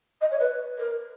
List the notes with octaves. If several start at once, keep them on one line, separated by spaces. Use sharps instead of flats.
D#5
C#5
B4
A#4